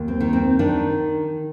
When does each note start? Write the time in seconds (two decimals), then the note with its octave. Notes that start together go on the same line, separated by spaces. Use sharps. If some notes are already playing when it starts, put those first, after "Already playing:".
Already playing: D#2
0.08 C4
0.21 D#3
0.33 C4
0.59 D#3 D4